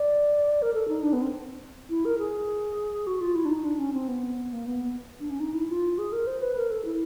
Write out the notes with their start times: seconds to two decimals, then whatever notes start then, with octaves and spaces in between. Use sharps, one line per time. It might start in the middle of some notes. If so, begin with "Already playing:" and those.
Already playing: D5
0.62 A#4
0.74 A4
0.88 D#4
1.03 D4
1.13 B3
1.22 C4
1.90 E4
2.05 A#4
2.19 G#4
3.07 F#4
3.21 F4
3.35 E4
3.45 D4
3.50 D#4
3.64 D4
3.79 C#4
3.94 C4
4.08 B3
4.53 A#3
4.66 B3
5.20 D4
5.30 C#4
5.40 D#4
5.54 E4
5.69 F4
5.98 G#4
6.13 A#4
6.27 C5
6.42 B4
6.57 A#4
6.71 A4
6.85 E4